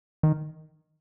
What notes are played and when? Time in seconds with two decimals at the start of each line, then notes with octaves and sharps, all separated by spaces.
0.23 D#3